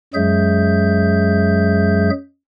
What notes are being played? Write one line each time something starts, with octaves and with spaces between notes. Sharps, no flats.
F#2 F#3 G#3 G#4 E5 G6